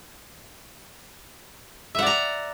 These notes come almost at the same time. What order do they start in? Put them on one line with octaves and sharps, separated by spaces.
E5 F#5 D5 A#5